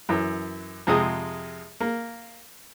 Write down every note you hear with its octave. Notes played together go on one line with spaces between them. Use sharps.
F#2 E3
F2 C3 G#3 D#6
A#3